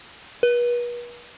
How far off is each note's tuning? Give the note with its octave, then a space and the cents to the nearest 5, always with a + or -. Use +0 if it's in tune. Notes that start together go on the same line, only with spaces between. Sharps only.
B4 -40